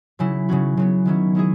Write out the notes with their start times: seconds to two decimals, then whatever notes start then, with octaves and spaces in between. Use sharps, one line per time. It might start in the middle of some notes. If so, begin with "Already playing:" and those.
0.19 C#3 F#3 C#4 E4
0.49 C#3 F#3 C#4 F#4
0.77 C#3 F#3 B3
1.05 D#3 F#3 C#4 E4
1.35 G#3 C#4 E4 G#4